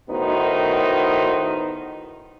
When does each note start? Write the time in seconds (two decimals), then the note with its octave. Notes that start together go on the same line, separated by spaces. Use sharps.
0.10 A2 D#3 B3 D#4 F#4 C5